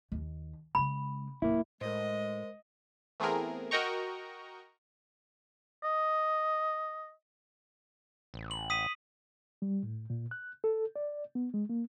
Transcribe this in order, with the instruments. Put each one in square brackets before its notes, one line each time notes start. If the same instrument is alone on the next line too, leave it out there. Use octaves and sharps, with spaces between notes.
[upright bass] D#2
[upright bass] C#3 G#3 [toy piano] B5
[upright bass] D1 [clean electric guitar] A#3 E4
[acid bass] A2 [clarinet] G#3 [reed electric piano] A#4 C5 [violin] D#5
[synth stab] E3 A3 B3 C4 G#4 A#4
F#4 A#4 D#5 G5 A#5 C#6
[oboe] D#5
[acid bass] A1
[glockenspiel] F#7
D#6 B6 D#7
[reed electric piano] G3
A2
A#2
F#6
A4
D5
B3
G#3
A#3